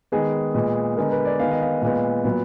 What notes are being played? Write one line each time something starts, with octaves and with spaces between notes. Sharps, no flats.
D#3 G#3 B3 G#4
A#2 G#3 B3
D3 G#3 B3 A#4
B4
D5
D#3 G#3 B3 F5
D#5
F5
A#2 G#3 B3 F5
A#2 F#3 B3